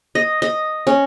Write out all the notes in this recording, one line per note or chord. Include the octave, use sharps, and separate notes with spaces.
D#5
D#5
C#4